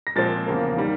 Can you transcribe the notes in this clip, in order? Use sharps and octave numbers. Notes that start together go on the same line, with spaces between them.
A#6
A#2 F3 G#3 C4 A6
E2 C#3 F3 A#3
D#3 G3